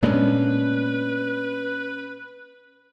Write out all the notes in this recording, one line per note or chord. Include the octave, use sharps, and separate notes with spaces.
A#2 G#3 B3 C#4 D4 B4